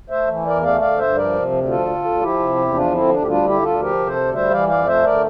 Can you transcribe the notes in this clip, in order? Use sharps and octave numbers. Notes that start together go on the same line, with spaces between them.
A3 C5 E5
E3
E2 A#4 D5
A3 D5 F5
D3 D5 F5
G2 C5 E5
F3 A#4 D5
C3
D2
F3 F4 A4
D3
D2
F3 E4 G4
C3
E2
F3 D4 F4
D3 C4 E4
D2 D4
G4
G3 D4 F4
D3 E4 G4
D2 F4 A4
F3 G4 A#4
C3
A4 C5
D2
G3 C5 E5
E3 D5 F5
F2 D5 F5
A3 C5 E5
D3 A#4 D5